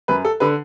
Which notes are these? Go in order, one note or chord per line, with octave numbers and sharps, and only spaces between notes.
F#2 B4
A4
D3 B4